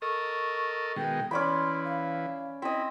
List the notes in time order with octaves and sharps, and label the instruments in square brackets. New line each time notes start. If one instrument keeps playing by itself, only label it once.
[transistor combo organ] A4 A#4 D#5 [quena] C#6
[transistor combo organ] B2 D#3 G#3 [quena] G5
[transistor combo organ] E3 [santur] C#4 D5 B5 [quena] C6
[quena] F5
[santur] C4 D#5 [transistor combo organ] E4